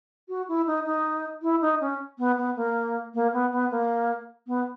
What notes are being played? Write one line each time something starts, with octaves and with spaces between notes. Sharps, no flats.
F#4
E4
D#4
D#4
E4
D#4
C#4
B3
B3
A#3
A#3
B3
B3
A#3
B3